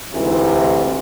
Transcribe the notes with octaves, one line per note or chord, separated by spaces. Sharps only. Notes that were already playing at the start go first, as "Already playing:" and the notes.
D2 G#2 C3 E3